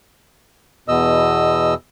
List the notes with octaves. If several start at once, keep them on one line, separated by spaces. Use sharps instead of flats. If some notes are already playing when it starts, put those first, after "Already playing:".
E2 B2 D#5 E6